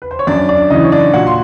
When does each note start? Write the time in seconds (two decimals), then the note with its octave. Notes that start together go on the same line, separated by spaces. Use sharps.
0.02 B4
0.11 C5
0.19 C#5
0.27 F#2 D4 D5
0.49 D4 D5
0.70 C#3 E3 D#4 D#5
0.84 C#5
0.92 D4 D5
1.14 A#2 F#4 F#5
1.27 C6